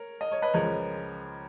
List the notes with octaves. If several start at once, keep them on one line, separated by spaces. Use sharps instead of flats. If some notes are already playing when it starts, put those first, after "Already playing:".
Already playing: A#4 C#5
D#5
C#5
B4 D#5
C#2 C#3 F3 A#4 C#5